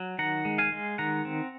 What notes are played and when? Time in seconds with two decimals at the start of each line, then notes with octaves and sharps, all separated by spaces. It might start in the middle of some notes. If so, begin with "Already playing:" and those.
Already playing: F#3
0.19 D#3 F#5 A#5
0.45 G#3
0.58 F5 G#5
0.72 G#3
0.98 D#3 F#5 A#5
1.25 C4